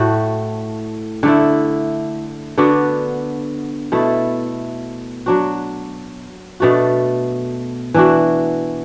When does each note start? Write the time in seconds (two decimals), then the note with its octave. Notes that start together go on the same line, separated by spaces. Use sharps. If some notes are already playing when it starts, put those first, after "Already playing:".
Already playing: A2 A3 F#4
1.23 D3 A3 E4
2.58 D3 B3 D4 F#4
3.92 B2 A3 E4
5.26 F#3 D4 F#4
6.60 B2 A3 D4 F#4
7.94 E3 D4 F#4